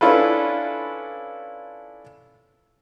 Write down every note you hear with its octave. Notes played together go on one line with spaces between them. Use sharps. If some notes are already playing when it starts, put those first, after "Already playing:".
C#4 D4 E4 F4 A4 B4